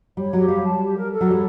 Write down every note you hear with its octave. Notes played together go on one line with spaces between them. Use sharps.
G3 C#5
F#3 G4
G3 F5
A5
G4
A#4
A4
F#3
G3 C#5